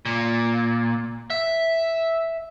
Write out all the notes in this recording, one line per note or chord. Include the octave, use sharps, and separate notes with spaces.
A#2
E5